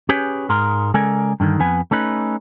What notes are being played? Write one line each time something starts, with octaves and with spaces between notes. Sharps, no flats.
C#4 G4 G#4 B4 C#5
G#2 G#3 A#4 C6
C#3 G#3 A4 A#4 D5 G#5
G2 D3 D#3
F2 B3 B4 G#5
A3 C#4 D#4 B4